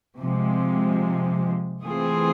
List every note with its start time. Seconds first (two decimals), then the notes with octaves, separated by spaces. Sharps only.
0.18 C3 F3 G#3
1.83 E3 A3 C4 F4 G#4